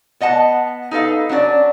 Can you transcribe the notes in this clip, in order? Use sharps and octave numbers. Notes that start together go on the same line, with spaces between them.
B3 D#5 F#5 A5
D#4 A4 B4 F5
F#3 C#4 D4 D5